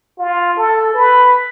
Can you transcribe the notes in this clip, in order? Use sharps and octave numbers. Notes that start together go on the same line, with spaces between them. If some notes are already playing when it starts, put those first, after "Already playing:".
F4
A4
B4